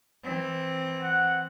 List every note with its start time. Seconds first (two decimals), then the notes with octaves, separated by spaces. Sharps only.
0.24 E3 C4
1.02 F#5